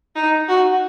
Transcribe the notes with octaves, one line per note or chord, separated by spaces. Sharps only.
D#4
F#4